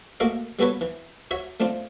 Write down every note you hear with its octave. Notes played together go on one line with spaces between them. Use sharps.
A3 A#3 F#4 A4 D#5 F5
G3 B3 F#4 A4 B4 C#5
E3
F#4 C#5 E5
A3 C4 D4 F4